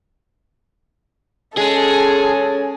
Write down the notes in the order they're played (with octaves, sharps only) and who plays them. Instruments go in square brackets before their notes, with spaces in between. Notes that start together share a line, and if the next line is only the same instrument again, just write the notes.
[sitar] G#3 [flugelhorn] C#4 [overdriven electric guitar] G#4 [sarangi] A4